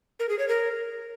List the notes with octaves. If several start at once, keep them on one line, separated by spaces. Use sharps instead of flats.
A#4
G#4
C#5
A#4